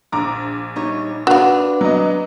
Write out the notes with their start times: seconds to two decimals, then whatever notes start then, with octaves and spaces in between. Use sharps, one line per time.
0.12 A#1 A#5 D6
0.76 G3 D#4 C#5
1.27 D4 F#4 B4 F5
1.81 F#3 D#5